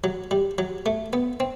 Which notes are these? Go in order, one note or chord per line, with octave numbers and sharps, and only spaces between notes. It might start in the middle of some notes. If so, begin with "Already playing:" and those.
F#3
G3
F#3
A3
B3
C4